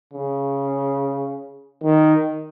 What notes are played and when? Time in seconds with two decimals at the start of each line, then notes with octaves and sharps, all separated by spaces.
0.13 C#3
1.83 D#3